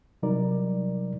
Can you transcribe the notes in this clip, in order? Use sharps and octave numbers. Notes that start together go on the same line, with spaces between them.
C3 F#3 G3 D#4 A#4 D5